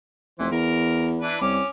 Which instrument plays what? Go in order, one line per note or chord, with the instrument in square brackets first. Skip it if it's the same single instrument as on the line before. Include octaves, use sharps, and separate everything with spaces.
[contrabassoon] F1 [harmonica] E3 C5
[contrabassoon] E2 [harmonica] A#4
[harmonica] E3 D4 B4
[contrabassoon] C2 [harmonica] C#4 D6